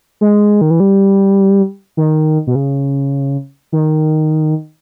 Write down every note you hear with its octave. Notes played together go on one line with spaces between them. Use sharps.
G#3
D#3
E3
G3
D#3
B2
C#3
D#3